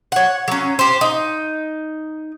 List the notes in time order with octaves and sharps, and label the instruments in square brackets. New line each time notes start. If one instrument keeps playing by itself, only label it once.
[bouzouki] C#5 F#5
F#3 C#4
G4 C5
D#4